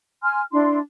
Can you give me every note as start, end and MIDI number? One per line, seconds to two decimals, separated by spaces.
0.23 0.41 80
0.23 0.41 84
0.23 0.41 89
0.52 0.78 62
0.52 0.78 64
0.52 0.78 84